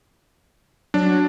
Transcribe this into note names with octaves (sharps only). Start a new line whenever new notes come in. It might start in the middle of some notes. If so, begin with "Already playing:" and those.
F#3 D4